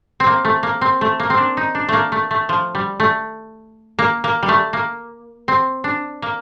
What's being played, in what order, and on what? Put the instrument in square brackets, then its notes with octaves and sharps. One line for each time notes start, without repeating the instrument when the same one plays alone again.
[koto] C4
A#3
A3
A#3
C4
A3
A#3
C4
D4
D#4
D4
A3 A#3
A3
A3
F3
G3
A3
A#3
A#3
G3
A3
A#3
C4
D4
A#3